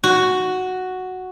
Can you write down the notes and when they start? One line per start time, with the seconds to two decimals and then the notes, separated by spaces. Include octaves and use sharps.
0.04 F#4